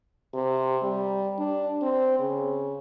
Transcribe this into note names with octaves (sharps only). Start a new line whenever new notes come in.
C3
G3
D4
C4
C#3